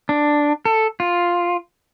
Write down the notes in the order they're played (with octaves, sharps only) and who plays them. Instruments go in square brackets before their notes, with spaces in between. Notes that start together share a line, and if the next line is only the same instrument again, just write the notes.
[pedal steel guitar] D4
A4
F4